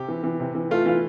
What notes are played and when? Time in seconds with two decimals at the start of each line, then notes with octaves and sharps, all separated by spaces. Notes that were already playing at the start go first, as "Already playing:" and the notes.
Already playing: C3 G4
0.08 E3
0.24 E3
0.40 C3
0.55 E3
0.71 A3 F4
0.86 E3 F4